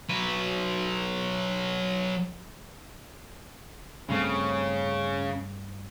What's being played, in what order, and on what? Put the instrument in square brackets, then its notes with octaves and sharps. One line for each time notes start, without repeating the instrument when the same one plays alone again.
[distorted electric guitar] F#3 B4
[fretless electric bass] G2 A3 C4 [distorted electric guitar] C#3